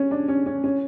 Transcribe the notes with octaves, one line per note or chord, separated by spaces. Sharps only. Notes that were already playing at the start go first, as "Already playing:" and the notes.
Already playing: C#4
D4
C#4
C#4
C#4